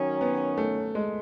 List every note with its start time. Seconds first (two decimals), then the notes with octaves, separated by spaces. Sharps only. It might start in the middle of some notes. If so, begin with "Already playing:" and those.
Already playing: D#3 F#3 C#4
0.21 B3
0.58 A3
0.95 G#3